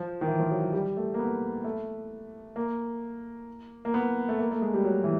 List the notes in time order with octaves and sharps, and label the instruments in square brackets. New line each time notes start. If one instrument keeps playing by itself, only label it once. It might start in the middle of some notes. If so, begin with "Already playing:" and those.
Already playing: [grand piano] F3
D#3
E3
F3
F#3
F#3
G3
A3
A#3
B3
A3
A#3
A#3
B3
A3
A#3
A3
G#3
G3
F#3
E3